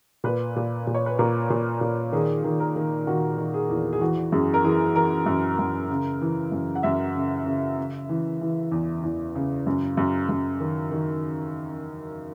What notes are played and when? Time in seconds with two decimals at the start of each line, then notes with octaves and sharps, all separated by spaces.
0.24 A#2 B4
0.56 A#2
0.87 A#2
0.95 C#5
1.06 B4
1.19 A#2 A#4
1.50 A#2
1.81 A#2
2.12 D#3 G#4
2.44 D#3
2.60 A#4
2.76 D#3
3.07 D#3 F#4
3.38 D#3
3.54 G#4
3.69 E2
3.93 G#4
4.01 E3 F#4
4.32 F#2 G#4
4.54 A#4
4.64 E3 G#4
4.95 E3 A#4
5.26 F#2
5.59 F#2
5.90 C#3
6.21 E3
6.52 F#2
6.75 F#5
6.83 F#2 E5
7.15 C#3
7.46 C#3
7.78 C#3
8.09 E3
8.41 E3
8.72 E2
9.03 E2
9.35 C#3
9.67 F#2
9.97 F#2
10.29 F#2
10.60 D#3
10.92 D#3